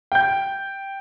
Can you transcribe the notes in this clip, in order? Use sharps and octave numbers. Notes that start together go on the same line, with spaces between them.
G5 G6